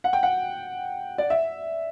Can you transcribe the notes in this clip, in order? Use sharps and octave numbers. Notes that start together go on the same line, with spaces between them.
F#5
G5
F#5
D5
E5